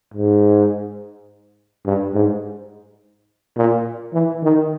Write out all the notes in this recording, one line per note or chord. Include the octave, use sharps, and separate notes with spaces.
G#2
G2
G#2
A#2
E3
D#3